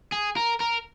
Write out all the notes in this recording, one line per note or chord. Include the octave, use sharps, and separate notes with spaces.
G#4
A#4
A#4